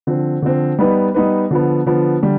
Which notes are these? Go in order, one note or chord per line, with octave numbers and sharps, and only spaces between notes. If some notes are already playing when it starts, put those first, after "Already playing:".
D3 F3 C4
D3 F3 C4
G3 B3 D#4 B4
G3 B3 D#4 B4
D3 F3 B3
D3 F3 B3
D3 G3